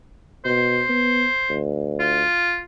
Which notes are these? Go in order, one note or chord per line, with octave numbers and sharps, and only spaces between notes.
B2 C5
B3
D2
F4